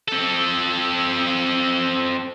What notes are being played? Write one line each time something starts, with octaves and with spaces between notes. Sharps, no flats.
C4 A4